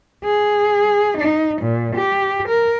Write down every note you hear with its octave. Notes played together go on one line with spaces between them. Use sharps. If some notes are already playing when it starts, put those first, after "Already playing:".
G#4
D#4
A#2
G4
A#4